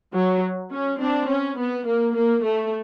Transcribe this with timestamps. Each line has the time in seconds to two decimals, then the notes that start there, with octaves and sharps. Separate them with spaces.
0.13 F#3
0.71 C#4
1.00 C4 D4
1.29 C#4
1.58 B3
1.86 A#3
2.15 A#3
2.44 A3